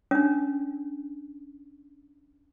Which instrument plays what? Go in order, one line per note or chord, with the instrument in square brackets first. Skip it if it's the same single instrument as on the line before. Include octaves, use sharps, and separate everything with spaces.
[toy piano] C#4 D4